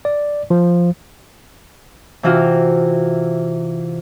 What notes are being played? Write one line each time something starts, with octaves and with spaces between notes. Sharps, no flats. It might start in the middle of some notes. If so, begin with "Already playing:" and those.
D5
F3
C3 E3 F4 F#4 F5